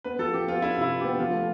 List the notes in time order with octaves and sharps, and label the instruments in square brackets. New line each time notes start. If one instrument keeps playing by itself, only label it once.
[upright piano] B3 [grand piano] B4
[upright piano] F3 [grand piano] A4
[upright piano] F3 [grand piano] G4
[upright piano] B3 [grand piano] F4
[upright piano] D4 [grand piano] E4
[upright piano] C3 [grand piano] E4
[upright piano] C3
[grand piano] G4
[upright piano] B3
[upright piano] F3 [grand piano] F4
[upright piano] A3